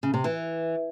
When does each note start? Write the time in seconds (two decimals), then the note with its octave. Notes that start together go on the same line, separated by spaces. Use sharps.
0.03 C#3
0.14 C3
0.24 E3